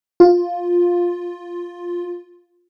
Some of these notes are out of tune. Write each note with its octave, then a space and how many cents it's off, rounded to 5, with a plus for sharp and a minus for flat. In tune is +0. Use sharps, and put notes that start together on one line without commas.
F4 +5